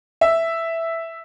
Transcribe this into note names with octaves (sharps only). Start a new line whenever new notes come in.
E5